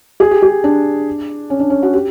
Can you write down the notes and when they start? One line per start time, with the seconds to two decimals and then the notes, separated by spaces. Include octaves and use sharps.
0.20 G#4
0.31 G4
0.42 G#4
0.64 D4
1.50 C#4
1.60 D4
1.70 C#4
1.83 F#4
1.93 G4